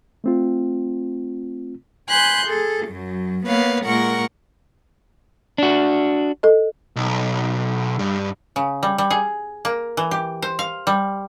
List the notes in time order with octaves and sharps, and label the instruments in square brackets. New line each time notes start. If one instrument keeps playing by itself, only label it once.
[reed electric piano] A3 C4 F4
[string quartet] G#5 B5 C6 F#6 G6
G#4 A4
F#2 F#3
A#3 B3 B4 C#5 F5
A#2 G#3 A#4 F#5 C#6
[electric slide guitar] D4 F#4
[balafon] A4 D#5
[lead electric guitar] B1
G2
[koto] C#3
G3
G3
G#4
A#3
E3
G4
C5
F5
G3